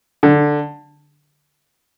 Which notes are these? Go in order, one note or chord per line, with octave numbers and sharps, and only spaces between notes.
D3